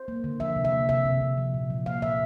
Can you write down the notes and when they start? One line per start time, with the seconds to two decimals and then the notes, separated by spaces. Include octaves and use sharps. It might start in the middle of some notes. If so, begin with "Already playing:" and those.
Already playing: C5
0.08 A#3
0.24 D3
0.40 F3 E5
0.56 C3
0.65 E5
0.73 A#3
0.89 C3 E5
1.05 C3
1.21 C3
1.38 F3
1.54 A#2
1.70 F3
1.86 A#3 F5
2.02 A#2 E5